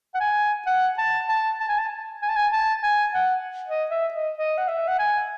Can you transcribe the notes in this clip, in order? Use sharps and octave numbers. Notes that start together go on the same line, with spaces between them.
F#5
G#5
F#5
A5
A5
A5
G#5
A5
G#5
A5
G#5
A5
G#5
F#5
D#5
E5
D#5
D#5
F#5
E5
F#5
G#5